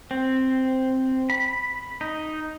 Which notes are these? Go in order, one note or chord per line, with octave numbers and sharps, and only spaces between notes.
C4
B5
D#4